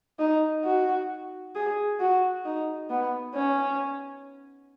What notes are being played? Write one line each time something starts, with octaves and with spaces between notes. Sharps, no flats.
D#4
F#4
G#4
F#4
D#4
B3
C#4